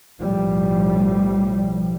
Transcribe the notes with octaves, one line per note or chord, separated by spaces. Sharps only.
B1 A2 F3 G3